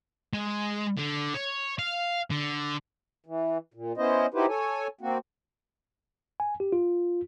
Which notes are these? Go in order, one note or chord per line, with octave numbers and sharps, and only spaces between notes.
G#3
D3
C#5
F5
D3
E3
A#2
B3 C#4 E4 C5 D#5
D#4 E4 F#4 G4 B4 C5
A4 C#5 G#5
A#3 C4 F#4
G#5
G4
F4